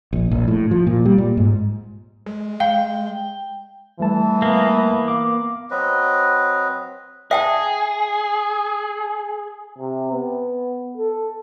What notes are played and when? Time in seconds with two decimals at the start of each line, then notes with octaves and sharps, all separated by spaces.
0.13 A#1
0.31 A#1
0.48 A2
0.71 F3
0.87 A#2
1.05 G3
1.18 A#2
1.37 G#2
2.26 G#3
2.60 F5 G5
4.00 E3 G3 A3 A5
4.42 A#3 B3
5.08 F5 D6
5.71 F#3 C4 B4 D#5
7.31 G#4 E5 G5 A5
9.79 C3
10.13 B3
10.97 A4